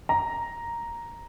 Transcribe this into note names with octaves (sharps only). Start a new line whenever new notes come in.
A#5